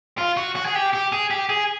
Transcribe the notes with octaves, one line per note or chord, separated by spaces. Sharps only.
F4
F#4
F#4
G#4
G4
G4
G#4
G4
G#4